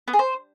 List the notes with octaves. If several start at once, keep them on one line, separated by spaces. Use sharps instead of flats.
B3
G#4
C5